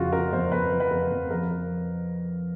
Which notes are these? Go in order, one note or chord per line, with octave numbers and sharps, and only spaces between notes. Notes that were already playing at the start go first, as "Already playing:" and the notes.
Already playing: F2 C#3 F4 F#4
C#3 A#4
F2 C5
F2 B4
F3
B4
F2 A#4
F2
F3 A#4